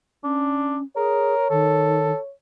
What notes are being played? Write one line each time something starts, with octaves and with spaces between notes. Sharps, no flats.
C#4 D4
G#4 A#4 C#5
D#3 A4